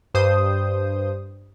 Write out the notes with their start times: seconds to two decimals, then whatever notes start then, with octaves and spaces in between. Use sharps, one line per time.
0.14 G2 C5 D#6 G6